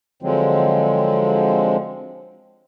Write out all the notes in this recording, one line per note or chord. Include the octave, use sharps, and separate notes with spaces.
D3 F3 F#3 G#3 C4